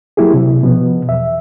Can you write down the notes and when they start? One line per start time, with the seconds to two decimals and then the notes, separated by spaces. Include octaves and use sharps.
0.17 F#3 A#3 E4 G4 G#4
0.34 C3
0.63 B2 F3 B3
1.09 E2 E5